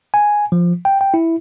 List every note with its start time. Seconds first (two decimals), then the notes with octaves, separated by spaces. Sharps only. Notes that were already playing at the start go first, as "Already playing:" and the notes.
0.14 G#5
0.52 F3
0.85 G5
1.01 G5
1.14 E4